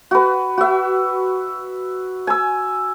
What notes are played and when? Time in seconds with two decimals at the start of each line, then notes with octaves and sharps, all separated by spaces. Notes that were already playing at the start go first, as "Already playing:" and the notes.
0.11 F#4 B4
0.58 F#4 E5
2.27 G#5 E6